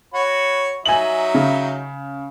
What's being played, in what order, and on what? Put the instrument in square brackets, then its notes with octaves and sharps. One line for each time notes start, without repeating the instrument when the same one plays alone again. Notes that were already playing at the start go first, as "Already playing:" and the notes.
[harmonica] F#4 C#5 B5
[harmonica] F#3 D#4 E5 [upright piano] G#5 F#7
[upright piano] C#3